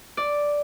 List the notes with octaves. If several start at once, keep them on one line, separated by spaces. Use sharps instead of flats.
D5